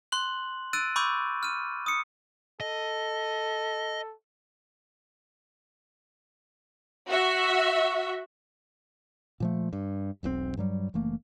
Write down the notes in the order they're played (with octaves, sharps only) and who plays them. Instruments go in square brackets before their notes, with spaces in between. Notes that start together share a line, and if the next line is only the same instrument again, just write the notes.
[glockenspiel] C6 F#6 F#7
E6 F#6 A6 D7 D#7
B5 C#6 D6 E6 G6
F6 D#7
D#6 C#7
[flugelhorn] A4 [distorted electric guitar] D#5
[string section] F#4 E5
[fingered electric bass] A#2 F3 A3
G2
E1 B1 C#3 C4
G2 F#3 G3
F#1 E3 A3 A#3